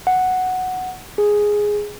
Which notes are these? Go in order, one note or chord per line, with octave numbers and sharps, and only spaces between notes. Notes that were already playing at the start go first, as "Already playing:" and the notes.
F#5
G#4